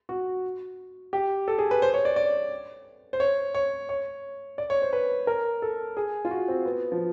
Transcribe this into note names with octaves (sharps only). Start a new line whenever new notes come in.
F#4
G4
A4
G#4
B4
C5
C#5
D5
D5
C5
C#5
C#5
C#5
D5
C#5
C5
B4
A#4
A4
G#4
F4
F#4
C4
B3
F3